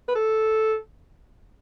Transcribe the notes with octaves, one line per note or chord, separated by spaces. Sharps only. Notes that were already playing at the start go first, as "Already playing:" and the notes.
B4
A4